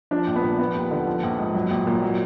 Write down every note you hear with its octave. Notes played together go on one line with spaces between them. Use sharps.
F3 D4
A#1
B3
A#2
F3 B3
D#2
D3
F3
A#1
G#2
F#3
A#1
A#2
F#3